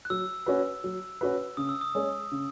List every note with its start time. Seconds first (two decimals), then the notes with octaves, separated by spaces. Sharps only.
0.05 F#6
0.10 F#3 E6
0.46 C#4 F#4 B4
0.84 F#3
1.21 C#4 F#4 B4
1.57 C#3 D#6
1.69 E6
1.81 D#6
1.94 G#3 C#4 G#4 C#5
2.31 C#3